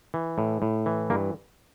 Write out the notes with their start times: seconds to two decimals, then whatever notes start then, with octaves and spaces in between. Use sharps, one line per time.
0.14 E3
0.38 A2
0.62 A2
0.86 E3
1.10 G2 A#3